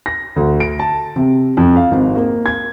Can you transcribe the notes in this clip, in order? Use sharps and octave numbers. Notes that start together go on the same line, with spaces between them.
A#6
D2
D7
A5
C3
F2
F5
G#1
A#3
G#6